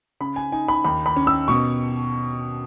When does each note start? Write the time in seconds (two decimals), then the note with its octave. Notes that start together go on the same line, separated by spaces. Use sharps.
0.20 C#3 B5
0.36 G#5
0.52 D#4 G#5
0.68 B5
0.84 D#2 B5
1.06 B5
1.16 C#4
1.27 E6
1.48 B2 C#6